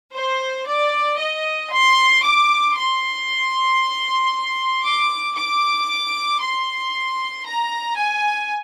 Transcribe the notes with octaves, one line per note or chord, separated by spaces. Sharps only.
C5
D5
D#5
C6
D6
C6
D6
D6
C6
A#5
G#5